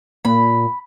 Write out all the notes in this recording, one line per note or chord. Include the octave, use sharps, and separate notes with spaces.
A#2 B5